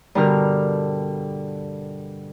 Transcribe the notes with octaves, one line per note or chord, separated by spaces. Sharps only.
G2 B2 D3 G4 A#4 F6